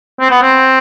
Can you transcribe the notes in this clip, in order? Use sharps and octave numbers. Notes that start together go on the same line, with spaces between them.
C4
B3
C4